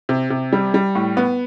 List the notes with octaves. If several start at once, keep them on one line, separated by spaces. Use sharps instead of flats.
C3
C3
G3
G3
A2
B3